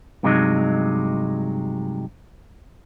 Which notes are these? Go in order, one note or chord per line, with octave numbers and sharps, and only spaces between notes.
G2 C3 F#3 G#3 C4 D#4